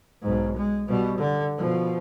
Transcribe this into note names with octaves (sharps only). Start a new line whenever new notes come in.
B1 G#2
G#3
B2 G3
D3
B2 F3